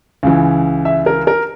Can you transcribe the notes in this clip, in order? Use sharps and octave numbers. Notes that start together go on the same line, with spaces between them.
C#2 C#3 E3
E5
A#4
A#4